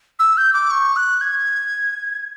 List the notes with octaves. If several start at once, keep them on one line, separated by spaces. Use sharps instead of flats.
E6
G6
D6
C#6
F#6
G#6